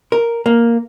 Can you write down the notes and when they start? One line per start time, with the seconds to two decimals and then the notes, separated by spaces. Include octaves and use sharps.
0.12 A#4
0.46 A#3